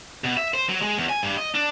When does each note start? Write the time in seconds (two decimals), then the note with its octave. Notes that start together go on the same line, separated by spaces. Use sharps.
0.24 B2
0.37 E5
0.54 C5
0.69 F#3
0.82 G#3
0.98 E2
1.09 G#5
1.23 G2
1.37 D#5
1.55 D4